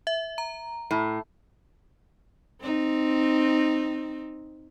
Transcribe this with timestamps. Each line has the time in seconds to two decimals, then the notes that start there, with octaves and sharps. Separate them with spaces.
0.07 E5
0.38 A#5
0.91 A2
2.61 C4 D#4